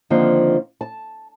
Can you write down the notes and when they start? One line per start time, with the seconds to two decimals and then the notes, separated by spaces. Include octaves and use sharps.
0.10 D3 D#3 F3 A#3 C4
0.81 A5